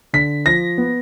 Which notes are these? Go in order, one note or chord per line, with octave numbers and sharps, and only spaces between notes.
D3 B6
F3 A#6
B3